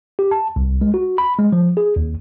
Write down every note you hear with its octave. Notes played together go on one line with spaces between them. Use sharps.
G4
A5
C2
G#3
F#4
B5
G#3
F3
G#4
D#2